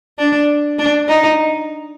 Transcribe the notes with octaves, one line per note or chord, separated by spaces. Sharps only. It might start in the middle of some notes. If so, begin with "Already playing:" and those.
D4
D4
D#4